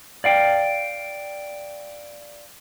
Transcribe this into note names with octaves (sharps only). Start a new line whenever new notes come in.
D5 F5 G5